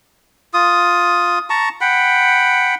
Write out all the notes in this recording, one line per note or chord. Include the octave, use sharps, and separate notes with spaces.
F4 D#6
A5 A#5 C#6
F#5 G5 B5